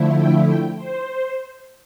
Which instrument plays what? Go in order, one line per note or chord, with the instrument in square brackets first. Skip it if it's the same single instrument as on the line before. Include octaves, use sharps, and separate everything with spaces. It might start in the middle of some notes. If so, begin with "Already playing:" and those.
Already playing: [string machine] D3 F3 A3 E4
G5
G5
C5